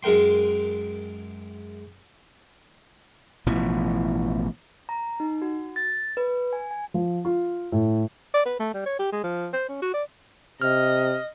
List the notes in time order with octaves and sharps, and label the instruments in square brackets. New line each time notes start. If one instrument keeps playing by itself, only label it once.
[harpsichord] F#2 G#3 A#4 G5 C6
[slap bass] A1 B2 E3 F3
[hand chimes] A#5
D#4
F#4
A6
B4
G#5
G#5
[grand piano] F3
F4
A2
[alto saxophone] D5
B4
A3
G3
C#5
G4
G#3
F3
C5
C#4
F#4
D5
[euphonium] C3 [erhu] D#5 [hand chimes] F6